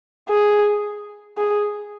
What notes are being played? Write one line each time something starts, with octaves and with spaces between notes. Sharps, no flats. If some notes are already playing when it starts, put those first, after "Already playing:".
G#4
G#4